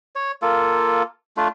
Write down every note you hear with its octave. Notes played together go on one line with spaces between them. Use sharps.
C#5
A#3 F4 A4
A3 D4 F4